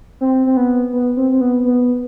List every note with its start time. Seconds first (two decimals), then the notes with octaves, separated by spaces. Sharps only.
0.21 C4
0.47 C4
0.57 B3
0.93 B3
1.17 C4
1.32 C4
1.41 B3
1.65 B3